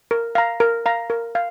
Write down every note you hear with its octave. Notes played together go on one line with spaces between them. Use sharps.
A#4
F5 A#5
A#4
F5 A#5
A#4
F5